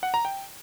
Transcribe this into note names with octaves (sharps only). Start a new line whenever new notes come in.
F#5
A#5
G5